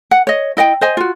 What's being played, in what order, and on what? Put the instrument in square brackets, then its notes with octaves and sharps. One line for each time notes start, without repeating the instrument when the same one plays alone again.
[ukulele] F#5
C#5 D#5
E4 D#5 F#5 G5
C5 D#5 G#5
F4 F#4